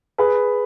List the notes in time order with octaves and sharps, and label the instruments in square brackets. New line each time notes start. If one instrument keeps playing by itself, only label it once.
[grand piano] G#4 B4